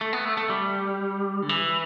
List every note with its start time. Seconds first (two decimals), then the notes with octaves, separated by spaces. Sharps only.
0.01 A3
0.13 B3
0.25 A3
0.37 A3
0.49 G3
1.42 D3
1.49 E3